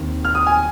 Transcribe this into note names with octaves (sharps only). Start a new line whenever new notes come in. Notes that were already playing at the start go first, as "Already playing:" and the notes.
Already playing: D#2 D#3 C4
F6
D#6
G#5